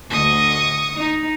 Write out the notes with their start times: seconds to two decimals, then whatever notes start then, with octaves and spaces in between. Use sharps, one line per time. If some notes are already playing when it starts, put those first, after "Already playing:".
0.10 D2 D#5 C#6 D#6
0.95 D#4